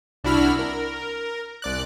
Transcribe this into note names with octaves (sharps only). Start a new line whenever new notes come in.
C2 D4 E4 F#4 B5 F6
A#4
C2 D5 F#6